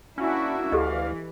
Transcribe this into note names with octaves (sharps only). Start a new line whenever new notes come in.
A#3 C#4 D4 E4 F#4 E5
D2 E3 G4 A4 D5 D#5 F5